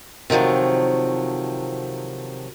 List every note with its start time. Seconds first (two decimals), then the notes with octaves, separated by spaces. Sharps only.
0.30 C3 D#3 F3 F#3 A3